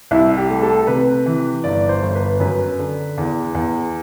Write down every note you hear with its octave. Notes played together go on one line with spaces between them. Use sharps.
C2 E4
G4
A3
A4
C3 B4
E3
G1 D5
C5
G1
B4
F#2 B4
D3
E2
E2